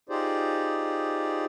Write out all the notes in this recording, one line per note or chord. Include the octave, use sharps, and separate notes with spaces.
D#4 F4 G4 G#4 C5 D5